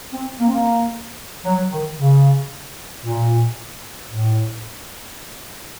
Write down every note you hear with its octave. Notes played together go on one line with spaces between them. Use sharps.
C4
A#3
C4
A#3
F#3
D#3
C#3
A#2
A2